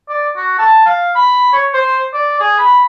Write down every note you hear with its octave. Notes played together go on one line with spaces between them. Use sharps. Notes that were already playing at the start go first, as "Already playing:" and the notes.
D5
F#4
A5
F5
B5
C#5
C5
D5
G#4
B5